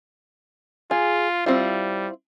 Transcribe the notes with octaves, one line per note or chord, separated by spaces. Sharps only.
F4 G#4
G3 C4 E4 F4